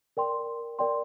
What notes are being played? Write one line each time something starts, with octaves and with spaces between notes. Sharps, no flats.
A#4 D5 G5 C6
A#4 D5 G5 C6